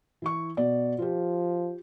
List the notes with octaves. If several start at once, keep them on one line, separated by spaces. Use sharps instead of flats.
E3 E4 C#6
B2 D5
F3 F4 G4